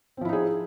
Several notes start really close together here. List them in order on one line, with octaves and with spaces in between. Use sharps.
C4 F3 E4 D#4 G#4